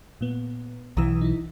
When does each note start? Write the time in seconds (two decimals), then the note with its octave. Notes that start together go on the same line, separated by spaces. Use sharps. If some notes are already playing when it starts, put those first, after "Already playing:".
0.21 A#2 B3
0.97 B1 E3 A#5 D#6 E6
1.21 D#4 E4